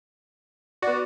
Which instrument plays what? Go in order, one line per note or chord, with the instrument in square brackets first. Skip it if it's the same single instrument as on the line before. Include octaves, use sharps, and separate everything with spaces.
[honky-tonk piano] B3 D5 [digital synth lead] F#4